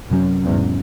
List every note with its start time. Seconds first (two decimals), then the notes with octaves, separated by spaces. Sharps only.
0.10 F#2 C3 F#3 C#4
0.44 E2 G#2